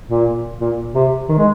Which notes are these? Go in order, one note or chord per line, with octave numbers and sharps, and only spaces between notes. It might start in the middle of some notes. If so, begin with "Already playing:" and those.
A#2
A#2
C3
D#3
G#3